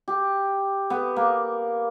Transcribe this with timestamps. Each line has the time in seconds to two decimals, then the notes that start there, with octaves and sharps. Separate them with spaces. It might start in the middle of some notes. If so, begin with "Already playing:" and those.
0.08 G4
0.90 B3
1.16 A#3